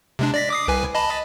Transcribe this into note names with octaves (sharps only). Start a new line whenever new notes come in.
C3 G#3 D4
D5 A#6 B6
D6 D#6 C7
C2 B4 G#5
D#5 A5 B5